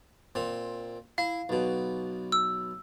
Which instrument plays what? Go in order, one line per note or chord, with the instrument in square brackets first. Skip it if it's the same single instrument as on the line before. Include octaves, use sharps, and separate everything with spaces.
[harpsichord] A#2 C4
[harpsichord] E4 [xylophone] F5
[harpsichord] B1 B2
[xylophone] E6